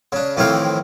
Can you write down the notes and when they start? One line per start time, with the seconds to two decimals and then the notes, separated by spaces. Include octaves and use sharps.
0.12 C#3 D4
0.37 F2 A2 D#3 E3 F5 G5